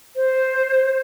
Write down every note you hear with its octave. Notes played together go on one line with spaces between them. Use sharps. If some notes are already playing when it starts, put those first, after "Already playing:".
C5